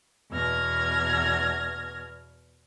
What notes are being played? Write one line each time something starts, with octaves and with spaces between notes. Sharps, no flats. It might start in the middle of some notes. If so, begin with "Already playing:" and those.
E2 B2 F6 G#6 A#6